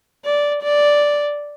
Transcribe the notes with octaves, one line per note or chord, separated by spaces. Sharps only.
D5
D5